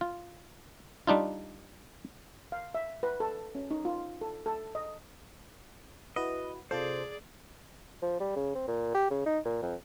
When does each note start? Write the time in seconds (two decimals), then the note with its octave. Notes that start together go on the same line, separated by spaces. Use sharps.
0.01 F4
1.07 G3 D4 D#4 F4
2.52 F5
2.75 E5
3.03 B4
3.20 A4
3.55 C#4
3.71 D#4
3.85 F4
4.21 A4
4.46 A4
4.75 D#5
6.16 E4 F#4 B4 D#5
6.71 C3 F4 G#4 A4 C5 D5
8.02 F3
8.20 G3
8.36 C#3
8.55 C4
8.68 A#2
8.95 G4
9.11 C#3
9.26 D#4
9.45 A#2
9.62 F2